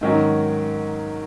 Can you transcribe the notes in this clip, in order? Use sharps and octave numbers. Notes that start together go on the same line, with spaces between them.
G#2 D#3 F#3 C#4 F#4